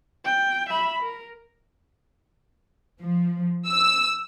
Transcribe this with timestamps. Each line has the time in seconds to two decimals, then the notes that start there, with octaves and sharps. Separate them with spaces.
0.25 G5
0.70 E5 B5
1.03 A#4
3.00 F3
3.67 E6